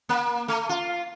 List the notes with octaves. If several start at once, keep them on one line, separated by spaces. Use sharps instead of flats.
A#3
A3
F4